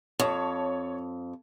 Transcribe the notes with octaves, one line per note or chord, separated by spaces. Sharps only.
F2 C#5 A5